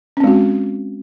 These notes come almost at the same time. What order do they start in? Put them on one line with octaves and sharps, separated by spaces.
C#4 C4 G#3 F#4